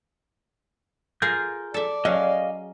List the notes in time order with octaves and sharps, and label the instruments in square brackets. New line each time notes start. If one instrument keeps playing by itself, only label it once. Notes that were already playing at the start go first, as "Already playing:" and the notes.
[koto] F4 G#4 A#4 [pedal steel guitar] G6
[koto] A4 E5 [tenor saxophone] D5
[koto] F#3 C#4 G#4 [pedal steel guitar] D#5 F5